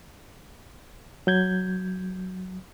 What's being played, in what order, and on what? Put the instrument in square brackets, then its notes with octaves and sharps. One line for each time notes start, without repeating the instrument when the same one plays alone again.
[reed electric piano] F#3 G6 G#6